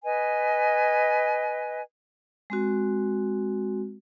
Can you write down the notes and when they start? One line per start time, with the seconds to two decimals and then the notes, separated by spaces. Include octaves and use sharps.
0.03 B4 D#5 G#5
2.50 G#3 C4 F#4